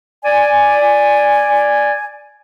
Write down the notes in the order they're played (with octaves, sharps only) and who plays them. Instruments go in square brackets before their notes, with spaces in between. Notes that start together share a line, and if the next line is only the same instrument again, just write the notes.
[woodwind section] D5 G#5